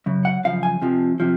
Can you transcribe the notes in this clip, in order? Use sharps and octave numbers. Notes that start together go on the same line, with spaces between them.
F#2 C#3
F#5
F#2 C#3 F3 F5
G#5
F2 C3 F3
C3 F3